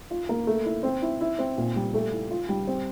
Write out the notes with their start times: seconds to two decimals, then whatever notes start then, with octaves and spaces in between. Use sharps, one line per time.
0.11 F4
0.29 A#3
0.47 A3
0.65 E4
0.83 C4
1.02 E4
1.21 E4
1.39 C4
1.58 A#2
1.76 G3
1.94 A3
2.13 E4
2.30 F4
2.49 G3
2.67 C4